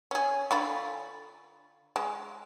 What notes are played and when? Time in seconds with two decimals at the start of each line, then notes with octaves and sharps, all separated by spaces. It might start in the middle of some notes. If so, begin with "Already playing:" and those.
0.11 C#4 G#4
0.51 D3 F4 B5
1.96 G#3